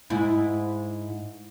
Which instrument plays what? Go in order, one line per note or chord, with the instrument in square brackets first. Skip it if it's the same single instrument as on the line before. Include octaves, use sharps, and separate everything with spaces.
[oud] G#2 E4